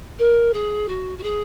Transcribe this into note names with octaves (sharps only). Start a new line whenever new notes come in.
A#4
G#4
F#4
F#4
G#4